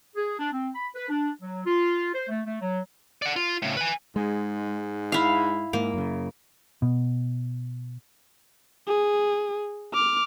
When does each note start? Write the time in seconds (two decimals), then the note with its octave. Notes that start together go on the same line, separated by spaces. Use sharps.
0.16 G#4
0.39 D4
0.52 C4
0.75 B5
0.95 B4
1.09 D4
1.42 F#3
1.66 F4
2.14 C5
2.29 A3
2.46 A3
2.62 F#3
3.22 D5 F#5
3.36 F4
3.62 A2 C#3
3.77 B4 G#5
4.16 G#2 G#3
5.12 E4 F5
5.73 G#2 A#3
5.94 F#2 C#3
6.82 B2
8.87 G#4
9.94 D6 F6